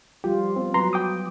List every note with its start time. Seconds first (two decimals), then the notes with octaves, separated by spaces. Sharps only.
0.24 F3 G3 F4 G4
0.56 B3 C4
0.74 F#3 B4 A#5 C6
0.93 G5 D6 D#6